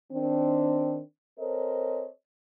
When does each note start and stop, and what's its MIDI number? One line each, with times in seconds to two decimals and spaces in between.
0.12 1.00 51
0.12 1.00 60
0.12 1.00 62
1.39 2.07 60
1.39 2.07 69
1.39 2.07 70
1.39 2.07 72
1.39 2.07 73
1.39 2.07 75